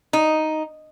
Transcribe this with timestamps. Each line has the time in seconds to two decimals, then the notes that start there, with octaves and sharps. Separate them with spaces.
0.13 D#4